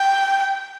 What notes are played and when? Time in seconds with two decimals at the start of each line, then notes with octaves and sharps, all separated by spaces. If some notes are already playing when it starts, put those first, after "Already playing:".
Already playing: G5